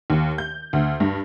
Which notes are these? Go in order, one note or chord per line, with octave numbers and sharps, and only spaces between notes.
D#2
G6
D2
G2